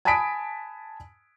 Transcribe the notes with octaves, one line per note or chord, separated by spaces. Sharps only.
G#5 A5 B5 D#6 B6 D7